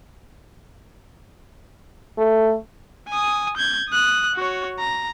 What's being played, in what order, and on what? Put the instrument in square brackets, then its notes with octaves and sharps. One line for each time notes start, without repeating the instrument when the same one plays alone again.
[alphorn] A3
[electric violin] G#5 D#6
G6 G#6
D#6 F#6
F#4 C#5
A#5